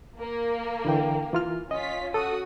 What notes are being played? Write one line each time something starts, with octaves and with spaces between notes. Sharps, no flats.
A#3
D3 E3 G5
E3 F4 F6
C#4 F4 D#5 B6
F#4 A4 D#6